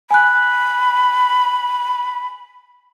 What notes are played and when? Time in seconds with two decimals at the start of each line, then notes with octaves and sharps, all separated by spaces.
0.11 G#5 B5 F#6